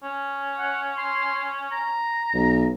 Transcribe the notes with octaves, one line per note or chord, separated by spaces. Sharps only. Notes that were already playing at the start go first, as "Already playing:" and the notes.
C#4
F#5
C6
A#5
B1